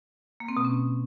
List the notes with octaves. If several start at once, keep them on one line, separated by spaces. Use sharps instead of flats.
A#3
C4
B2
C#4